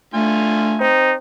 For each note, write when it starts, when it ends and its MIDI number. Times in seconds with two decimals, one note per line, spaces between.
0.14 0.78 50
0.14 0.91 57
0.14 0.78 65
0.14 0.78 80
0.80 1.15 60
0.80 1.13 63